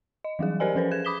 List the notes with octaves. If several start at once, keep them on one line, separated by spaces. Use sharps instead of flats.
D#5
E3 F#3 G3 G#4
G4 A#4 C5 D5 D#5 G#5
F3 C#4 A4 B4 C5
G#4 G#6 E7
B5 D6 D#6 B6 E7 G7